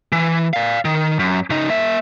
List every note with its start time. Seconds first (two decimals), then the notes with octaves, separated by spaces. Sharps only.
0.12 E3
0.53 D5 F5
0.85 D#3
1.19 F#2
1.50 C#3 D#4
1.69 A#3 E5